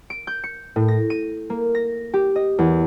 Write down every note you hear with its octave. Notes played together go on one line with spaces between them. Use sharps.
D7
G6
C#7
A2
A#6
D#7
A#3
A#6
G4
D#5
E2